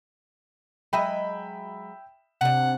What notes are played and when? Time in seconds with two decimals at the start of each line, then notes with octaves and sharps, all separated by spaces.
0.93 F#3 G#3 D#5 E5 G5 B5
2.41 C3 D4 F#5